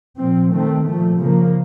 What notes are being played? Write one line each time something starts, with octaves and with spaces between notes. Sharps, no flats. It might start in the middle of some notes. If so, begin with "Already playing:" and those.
A#2 F3 C4
D#3 A3 C4
A#2 F3 A3
C#3 F3 A#3